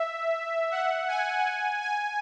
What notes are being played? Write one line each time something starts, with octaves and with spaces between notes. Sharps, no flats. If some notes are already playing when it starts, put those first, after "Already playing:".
Already playing: E5
F#5
G#5
G#5